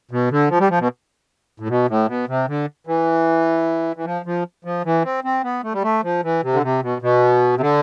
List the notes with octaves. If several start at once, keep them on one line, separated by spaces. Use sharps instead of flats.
B2
D3
F3
G3
F3
B2
A2
B2
A2
B2
C3
D3
E3
E3
F3
F3
F3
E3
C4
C4
B3
A3
G3
A3
F3
E3
C3
D3
C3
B2
B2
C3
D3